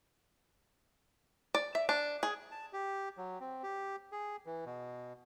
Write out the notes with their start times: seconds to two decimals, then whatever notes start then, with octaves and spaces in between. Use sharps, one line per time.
1.55 D5
1.75 E5
1.89 D4
2.23 G#4
2.51 A5
2.73 G4
3.17 F#3
3.40 C4
3.63 G4
4.12 G#4
4.46 E3
4.66 B2